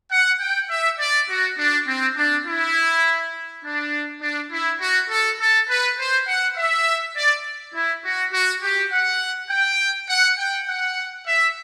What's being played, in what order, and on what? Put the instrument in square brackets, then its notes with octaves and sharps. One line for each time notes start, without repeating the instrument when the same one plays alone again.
[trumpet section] F#5
G5
E5
D5
F#4
D4
C4
D4
E4
D4
D4
E4
F#4
A4
A4
B4
C5
F#5
E5
D5
E4
F#4
F#4
G4
F#5
G5
F#5
G5
F#5
E5